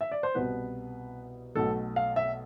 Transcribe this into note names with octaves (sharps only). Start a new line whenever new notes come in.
E5
D5
C5
C2 B2 B3 B4
B1 B2 A3 A4
F5
E5